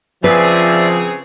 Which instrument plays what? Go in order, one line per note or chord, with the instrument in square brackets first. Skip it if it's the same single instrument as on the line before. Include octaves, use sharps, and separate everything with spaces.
[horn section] C#3 C4 G#4 [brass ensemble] F3 [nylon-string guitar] B4 [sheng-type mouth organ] D5 E5